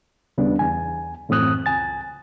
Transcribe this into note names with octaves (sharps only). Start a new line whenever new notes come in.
D#2 C#3 G3 B3 D4
E2 G#5
F#2 A2 E3 C4 D#6 F#6
C#2 G#5 A6